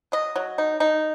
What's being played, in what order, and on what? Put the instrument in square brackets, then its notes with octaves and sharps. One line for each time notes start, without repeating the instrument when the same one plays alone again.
[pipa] F#3 D#5
F#3
D#4
D#4